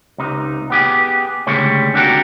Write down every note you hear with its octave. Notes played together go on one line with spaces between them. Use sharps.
C#2 C3 D#4
B3 G4 G#4
D2 C#3 G3 G#3 C#5
C4 D4 F#4 G4 A4 A#4